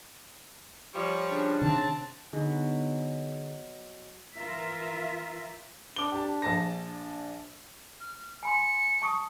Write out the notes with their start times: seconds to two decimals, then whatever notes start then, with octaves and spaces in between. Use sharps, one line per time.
0.94 F3 G3 C#5
1.32 C#3 D4
1.61 C3 D#3 C4 A5
2.33 B2 D3 F#3 D#4 G#4
4.35 E3 F4 A#4 E5
5.96 D4 D6 G7
6.12 G4 A5
6.42 A#1 A5 A#6
6.82 D4
8.00 F6
8.43 G#5 B5 C6 C#7
9.02 A5 C#6 D#6